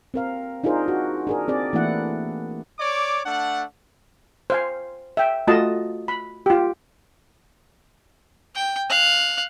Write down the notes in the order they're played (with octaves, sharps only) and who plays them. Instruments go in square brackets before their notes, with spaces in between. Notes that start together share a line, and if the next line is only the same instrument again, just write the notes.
[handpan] C4 A#4 F5
D4 D#4 F4 G#4 A#4 C5
F#4
D4 G#4 A#4
C4 G#4 D5
E3 A3 A#3 D4 E4 F#5
[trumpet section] C#5 D5 D6
A3 D4 F#5
[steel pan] C5 F5 G#5
E5 G5
A3 F4 F#4 D#5 A5
B5
F4 G4
[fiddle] G5
F5 F#6